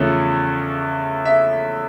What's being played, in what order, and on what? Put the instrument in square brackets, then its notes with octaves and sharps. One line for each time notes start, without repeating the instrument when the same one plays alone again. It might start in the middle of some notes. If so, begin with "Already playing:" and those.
Already playing: [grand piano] E2 C#3 F3 A3 C#4
E5